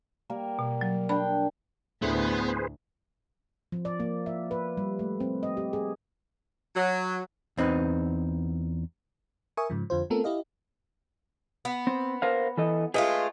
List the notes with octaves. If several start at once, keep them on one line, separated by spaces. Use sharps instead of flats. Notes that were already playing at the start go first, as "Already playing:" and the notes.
G3 A#3 A#4
B2
F#3
D4 G5 B5
D2 A2 B3 G#4 B4 C5
F3
D5
A#3
E5
B4
G3
A3
C4
D#5
G4
G#4
F#3
E2 C4 D#4 B4
A#4 E5 G#5 C#6 D#6
G#2 C#3 F3
F2 D3 F4 C5
A3 B3 C4 F4 A4 A#4
E4 G4 D#5 F5
B3
C4
A#4 C5 F5
E3 A4 D#5
G#3 A3 F4 G#4 B4 D#5